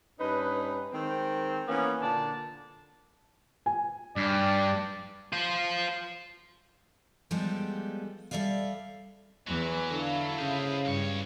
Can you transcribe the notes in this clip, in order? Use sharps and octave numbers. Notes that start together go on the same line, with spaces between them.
G2 C#4 D#4 B4
D#3 G#3 C4
E3 A#3 B3 C#4
A#2 D3 D4 A5
G#5
G2 D5
F4 C5
F3 G3 G#3 B3 G4 A4
G3 A4 D5 E5 F5
E2 E3 F#3
D3 E4 A4 F5
C#3 C5 D#5
C#2 G2 C#5